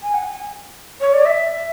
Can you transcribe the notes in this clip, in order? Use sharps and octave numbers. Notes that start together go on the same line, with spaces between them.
G#5
F#5
G#5
C#5
D5
E5